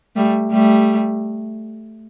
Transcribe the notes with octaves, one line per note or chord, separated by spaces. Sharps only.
G3 A3
G3 A3